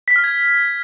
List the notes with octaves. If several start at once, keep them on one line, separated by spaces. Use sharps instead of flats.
B6
F6
G#6